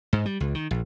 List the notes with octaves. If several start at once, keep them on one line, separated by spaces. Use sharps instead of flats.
G#2
G3
C#2
D#3
A#1